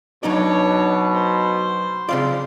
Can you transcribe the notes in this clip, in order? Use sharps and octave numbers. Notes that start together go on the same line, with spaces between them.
B2 F#3 D4 D#4 C#5 D5
C5
C#3 C4 F4 D5